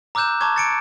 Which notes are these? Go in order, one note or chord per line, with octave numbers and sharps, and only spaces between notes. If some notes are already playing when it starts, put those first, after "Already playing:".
A#5 D6 E6 F#6 G6 E7
A5 A#5 C#6 D6 G#6
A6 C#7 D7